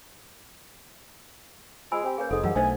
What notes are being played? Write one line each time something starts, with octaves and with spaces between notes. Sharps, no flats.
F3 G#3 G#5 B5 E6
C4 G4
A#3 C#4 G#4 B4 C#5
F1 G#2 A4 D#6
F#2 E3 G3 A#4 F5 F#5
B1 A3 D4 C5 D#5 G#5